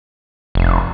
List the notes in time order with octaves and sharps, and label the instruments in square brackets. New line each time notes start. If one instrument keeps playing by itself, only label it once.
[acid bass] F1